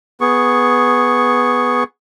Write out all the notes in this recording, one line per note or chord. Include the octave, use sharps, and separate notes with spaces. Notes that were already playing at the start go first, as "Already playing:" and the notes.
B3 G#4 C#6